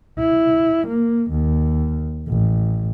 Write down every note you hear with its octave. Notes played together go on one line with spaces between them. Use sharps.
E4
A#3
D#2
A1